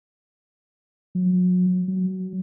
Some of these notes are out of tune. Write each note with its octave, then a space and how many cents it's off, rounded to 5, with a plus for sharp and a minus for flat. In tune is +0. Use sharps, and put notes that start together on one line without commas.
F#3 -35
F#3 +15